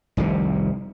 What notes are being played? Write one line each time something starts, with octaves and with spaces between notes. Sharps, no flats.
F1 C2 C3 D#3